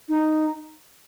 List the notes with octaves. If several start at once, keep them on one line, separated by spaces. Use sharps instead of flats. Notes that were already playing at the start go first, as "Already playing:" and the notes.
D#4